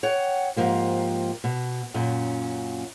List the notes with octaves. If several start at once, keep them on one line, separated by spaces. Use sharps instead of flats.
C#5 F#5 G5
G#2 F3 A#3 G4
B2
F#2 A#2 C#4